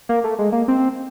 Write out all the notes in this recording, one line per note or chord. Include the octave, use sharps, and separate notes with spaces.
A#3
A3
G#3
A#3
C4